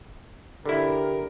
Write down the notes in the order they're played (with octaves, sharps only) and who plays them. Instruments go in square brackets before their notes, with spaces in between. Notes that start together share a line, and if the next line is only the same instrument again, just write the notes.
[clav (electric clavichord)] D3 E4 [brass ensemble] G4 A#4